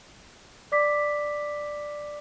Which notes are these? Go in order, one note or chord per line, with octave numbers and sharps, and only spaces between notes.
D5 D6 B6